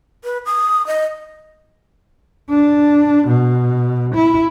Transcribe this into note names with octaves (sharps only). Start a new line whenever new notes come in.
B4
D#6
D#5
D4
B2
E4